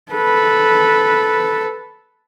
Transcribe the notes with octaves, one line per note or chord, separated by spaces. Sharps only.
A4 B4